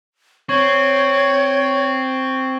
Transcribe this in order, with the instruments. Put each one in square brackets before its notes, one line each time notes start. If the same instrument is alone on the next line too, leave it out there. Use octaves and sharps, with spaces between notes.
[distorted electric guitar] C4 [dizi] C#5 [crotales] C#6 G#6 F#7